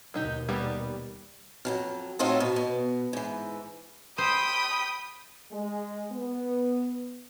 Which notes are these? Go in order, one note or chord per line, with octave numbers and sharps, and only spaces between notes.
D#2 B2 F#3 D#4 G4
G3 A#3 B3
F2 E3 F#3
A2 F#3 C4 D#4 F4 A4
B2
B2
G#2 E3
C5 G5 B5 D#6
G#3
B3